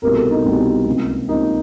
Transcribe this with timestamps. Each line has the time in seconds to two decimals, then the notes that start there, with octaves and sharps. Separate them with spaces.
0.02 C2 B2 G3 B3 A#4
0.16 A4
0.31 D#4
0.44 C2 B2 G3 B3
0.86 C#2 C3 F3 A#3
1.28 C#2 C3 F3 A#3 D#4